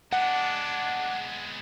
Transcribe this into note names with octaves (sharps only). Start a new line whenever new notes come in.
G#3 B3 D4 F#5